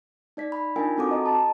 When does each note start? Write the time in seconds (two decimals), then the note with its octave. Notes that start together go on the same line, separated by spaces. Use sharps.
0.37 D#4 D5 B6
0.52 B5
0.76 D4 D#4 F4 A#4 G5 G#5
0.98 C4 F#4 A4 D6
1.11 D#5 A#5
1.26 A5